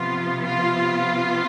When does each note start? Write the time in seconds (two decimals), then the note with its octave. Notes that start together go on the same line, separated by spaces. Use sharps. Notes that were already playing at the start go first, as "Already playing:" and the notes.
Already playing: C3 F3 B3 F4
0.46 F4